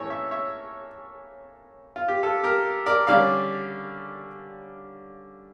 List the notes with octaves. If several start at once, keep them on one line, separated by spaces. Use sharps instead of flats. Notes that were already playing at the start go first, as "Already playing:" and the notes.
Already playing: A2 E3 A#3 C#4 A4 C#5
C#5 E5
C#5 E5
F4
G4
F4 A4
G4 A#4
A#4 D5
D3 G3 C#4 D5 F5